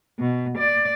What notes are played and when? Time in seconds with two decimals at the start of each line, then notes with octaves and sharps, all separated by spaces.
0.19 B2
0.57 D5